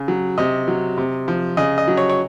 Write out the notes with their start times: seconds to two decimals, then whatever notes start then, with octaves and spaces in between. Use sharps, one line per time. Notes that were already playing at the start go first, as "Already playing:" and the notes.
Already playing: C#3
0.08 F#3
0.38 C3 D#5
0.68 F#3
0.97 C3
1.28 F3
1.57 C#3 D#5
1.78 D#5
1.88 F#3
1.97 C#5
2.09 C#5